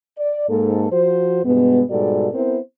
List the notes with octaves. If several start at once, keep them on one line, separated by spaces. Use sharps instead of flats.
D5
G#2 A#3 A4
F3 F#4 C5
G2 B2 G#3 B3
G#2 B2 G3 F#4 A4 D5
B3 C4 E4 A#4 C5